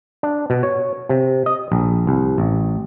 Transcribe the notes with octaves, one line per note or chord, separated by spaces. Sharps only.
D4
B2
C#5
C3
D#5
A#1
C2
A1